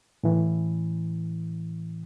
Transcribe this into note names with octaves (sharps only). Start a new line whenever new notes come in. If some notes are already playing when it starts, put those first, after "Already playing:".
A2 E3